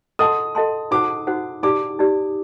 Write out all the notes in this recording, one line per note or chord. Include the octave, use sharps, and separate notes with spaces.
A4 D#5 F#5 A5 C6 D#6
A4 D#5 F#5 A5 C6
D#4 F#4 C5 F#5 D6
D#4 F#4 C5 F#5
D#4 G4 D5 D6
D#4 G4 D5